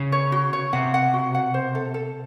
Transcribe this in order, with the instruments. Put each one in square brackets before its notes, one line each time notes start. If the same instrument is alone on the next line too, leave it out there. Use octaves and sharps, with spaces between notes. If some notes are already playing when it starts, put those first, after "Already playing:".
Already playing: [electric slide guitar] C#3
[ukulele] C#5
F#4
C#5
[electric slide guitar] C3 [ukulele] F#5
[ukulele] F#5
F#4
F#5
C5
A4
A4